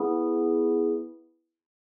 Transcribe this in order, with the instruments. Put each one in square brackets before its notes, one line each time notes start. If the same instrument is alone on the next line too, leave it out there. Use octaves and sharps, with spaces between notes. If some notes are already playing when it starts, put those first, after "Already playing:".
Already playing: [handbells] B3 E4 G#4